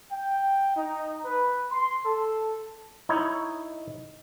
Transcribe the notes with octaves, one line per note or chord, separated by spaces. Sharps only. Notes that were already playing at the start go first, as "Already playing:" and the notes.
G5
D#4
B4
C6
A4
D#4 E4 C#5